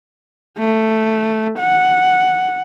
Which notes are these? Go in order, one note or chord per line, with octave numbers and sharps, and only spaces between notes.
A3
F#5